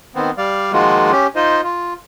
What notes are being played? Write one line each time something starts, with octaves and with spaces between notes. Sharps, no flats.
D#3 B3 C4
G3 D5 F5
D#3 F3 G#3 A#3 F4 F#4
C#4 G4
D#4 F4 C5 D#5
F4